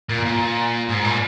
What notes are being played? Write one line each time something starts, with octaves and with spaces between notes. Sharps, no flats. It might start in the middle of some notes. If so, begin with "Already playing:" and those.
A#2
A#2
G#2
A#2